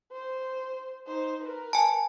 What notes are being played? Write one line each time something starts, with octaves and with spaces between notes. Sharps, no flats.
C5
D#4 C5
A#4 B4
G#5 A5